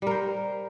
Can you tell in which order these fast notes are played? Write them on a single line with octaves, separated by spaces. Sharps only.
G3 A#4 C5